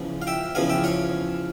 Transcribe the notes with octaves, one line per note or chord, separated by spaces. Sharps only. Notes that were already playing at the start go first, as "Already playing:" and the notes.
Already playing: E2 C#3 F3
F5
E5 G5
E2 C#3 F3 F5 G#5
E5 G5
C#5 F5